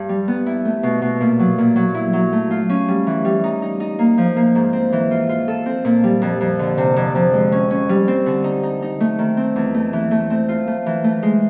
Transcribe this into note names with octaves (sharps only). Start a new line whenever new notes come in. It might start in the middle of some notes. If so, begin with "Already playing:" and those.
Already playing: G2
G3
B3
E4
A3
B2
B2
A#2
F#3
A#2
F#3
E4
F#3
A3
F4
C#4
G3
E3
G3
D#4
D#4
D#4
A#3
F3
A#3
G#2
C4
E3
F4
F4
A4
C4
A#2
G3
F2
F2
D3
C3
F2
F2
G#3
C#4
C#4
G3
C4
D3
D#4
D#4
D#4
A3
D#3
C4
E2
A3
E3
A3
C4
F4
A3
E3
A3
G#3